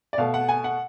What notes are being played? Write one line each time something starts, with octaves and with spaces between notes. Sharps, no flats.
D5
B2 A3 F5
F#5
G#5
F#5